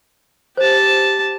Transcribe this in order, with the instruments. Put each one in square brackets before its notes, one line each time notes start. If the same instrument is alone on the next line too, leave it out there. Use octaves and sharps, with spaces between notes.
[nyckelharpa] G4 A5 [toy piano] C5